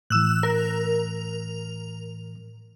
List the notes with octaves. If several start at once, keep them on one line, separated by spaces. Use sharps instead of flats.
A2 E3 E6 F#6
A#4